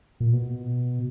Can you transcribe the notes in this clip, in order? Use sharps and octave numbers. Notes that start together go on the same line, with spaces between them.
A#2
B2